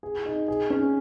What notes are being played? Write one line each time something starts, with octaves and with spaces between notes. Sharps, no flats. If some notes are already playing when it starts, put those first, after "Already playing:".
G#4
D#4
G#4
C#4